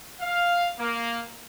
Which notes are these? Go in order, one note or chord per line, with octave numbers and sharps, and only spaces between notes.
F5
A#3